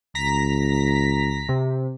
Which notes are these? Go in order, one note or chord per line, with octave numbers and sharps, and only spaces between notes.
C#2 A#5 A#6 B6
C3